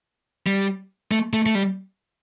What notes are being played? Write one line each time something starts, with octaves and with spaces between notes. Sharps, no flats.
G3
A3
A3
A3
G3